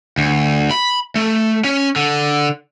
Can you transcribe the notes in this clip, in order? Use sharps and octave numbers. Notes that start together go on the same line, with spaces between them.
D2
B5
A3
C#4
D3